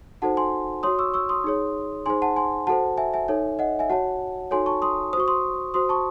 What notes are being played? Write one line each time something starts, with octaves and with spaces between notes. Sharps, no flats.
D#4 F#4 A4 C5 F#5 A5
G#5 C6
F#4 C#5 C6 D#6
C#6 E6
C#6 E6
C6 D#6
D#4 G#4 C#5
D#4 G#4 C5 G#5 C6
F#5 A5
G#5 C6
F#4 A4 C5 F#5 A5
E5 G#5
E5 G#5
D#4 A4 C#5
D#5 F#5
E5 G#5
F#4 C#5 F#5 A5
D#4 F#4 A4 C#5 G#5 C6
A5 C#6
C6 D#6
F#4 C5 C#6 D#6
C6 D#6
F#4 C5 C6 D#6
A5 C#6